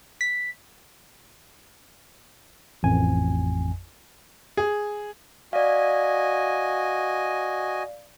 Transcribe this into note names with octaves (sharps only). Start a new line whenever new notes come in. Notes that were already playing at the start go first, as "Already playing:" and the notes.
B6
A1 F2 G#5
G#4
F#4 D5 D#5 F5 G#5